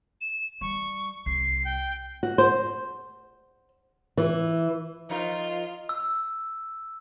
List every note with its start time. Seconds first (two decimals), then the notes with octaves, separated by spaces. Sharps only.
0.21 E7
0.61 G3 C#6
1.26 C2 C7
1.65 G5
2.23 F#4
2.38 C5
4.17 E3
5.10 F3 D#4 F4 A#4
5.89 E6